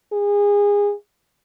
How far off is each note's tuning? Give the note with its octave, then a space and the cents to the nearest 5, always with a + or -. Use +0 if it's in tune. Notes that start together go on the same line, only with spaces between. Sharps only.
G#4 -25